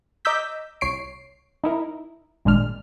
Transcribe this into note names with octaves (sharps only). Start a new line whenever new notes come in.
D#5 A#5 D6 E6 G6 B6
C2 C#5 C7 D7
D#4 E4 A#4
G#1 A#2 G#3 D4 F6